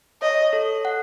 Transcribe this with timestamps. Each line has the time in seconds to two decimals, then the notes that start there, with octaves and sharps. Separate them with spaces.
0.22 C#5 D#5
0.53 A4
0.85 F#5